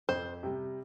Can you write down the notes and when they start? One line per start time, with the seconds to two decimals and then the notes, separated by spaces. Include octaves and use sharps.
0.09 F2 C5
0.43 C3 G3